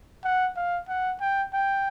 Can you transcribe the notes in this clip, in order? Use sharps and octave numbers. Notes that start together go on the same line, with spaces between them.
F#5
F5
F#5
G5
G5